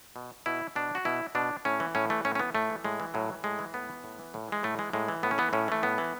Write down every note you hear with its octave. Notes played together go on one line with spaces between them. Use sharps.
B2
B2 E4
B2 D4
F#4
B2 E4
B2 D4
A2 C#4
E3
A2 C#4
E3 A3
A2 C#4
C#4
E3 B3
A2 A3
E3
A2 G#3
E3
A2 F#3
E3
A2 G#3
E3
A2 B3
E3
A2
E3
A2
E3 G#3
A2 A3
E3 G#3
A2 G#3
E3
A2 B3
C#4
E3 B3
A2 C#4
E3 A3
A2 B3
E3